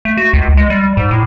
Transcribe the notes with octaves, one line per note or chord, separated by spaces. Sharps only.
A3
F#4
C#2
G#3
G3
G#2
A2